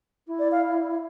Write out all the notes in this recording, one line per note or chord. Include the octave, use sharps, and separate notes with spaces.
E4
D5
F5